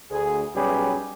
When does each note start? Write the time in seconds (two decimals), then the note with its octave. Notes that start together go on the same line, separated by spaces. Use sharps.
0.11 D2 G#4
0.55 B1 G3 C#4 G4 G#4 B4